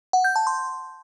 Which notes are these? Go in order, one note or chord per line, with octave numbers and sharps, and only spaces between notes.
F#5
G6
A5
C6